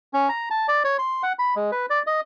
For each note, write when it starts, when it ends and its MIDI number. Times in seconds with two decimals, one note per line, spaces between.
0.13 0.29 61
0.29 0.49 82
0.50 0.67 81
0.68 0.83 74
0.84 0.97 73
0.99 1.23 84
1.23 1.33 78
1.39 1.55 83
1.56 1.71 56
1.72 1.86 71
1.90 2.03 74
2.07 2.21 75